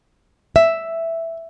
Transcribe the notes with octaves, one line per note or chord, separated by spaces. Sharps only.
E5